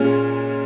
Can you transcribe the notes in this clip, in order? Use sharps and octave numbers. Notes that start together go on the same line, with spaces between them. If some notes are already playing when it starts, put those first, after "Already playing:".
Already playing: A#2 G#3 C#4 F4